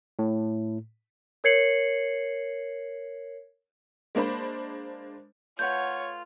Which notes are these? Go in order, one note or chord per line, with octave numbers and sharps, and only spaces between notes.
A2
A#4 C#5 G#6 C7 C#7 F#7
G#3 A#3 D4 C5 B5
A3 F4 B4 C#5 F#5 F6 G6